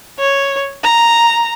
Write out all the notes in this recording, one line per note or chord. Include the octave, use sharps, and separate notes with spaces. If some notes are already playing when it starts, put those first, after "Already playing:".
C#5
A#5